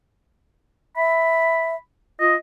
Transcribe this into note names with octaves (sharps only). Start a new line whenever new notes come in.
E5 B5
F4 D#5